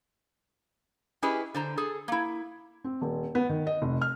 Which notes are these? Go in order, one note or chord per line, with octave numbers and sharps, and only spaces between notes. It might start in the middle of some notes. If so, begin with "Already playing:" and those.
C#4 E4 G4 G#4 B4 D#5
D3 C5 A#5
G#4 A4
A#3 E4
C4
D#1
B3
D#3
D#5
F1
F6